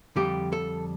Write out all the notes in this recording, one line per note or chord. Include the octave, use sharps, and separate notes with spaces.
F2 D3 G3 G4
A4